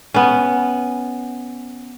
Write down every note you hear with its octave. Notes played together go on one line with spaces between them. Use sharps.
B3 C#4